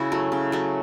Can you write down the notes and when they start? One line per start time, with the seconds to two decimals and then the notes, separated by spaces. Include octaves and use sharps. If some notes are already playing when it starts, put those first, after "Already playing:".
Already playing: C#3 E4 F#4
0.12 F#3 A3
0.32 C#3
0.52 F#3 A3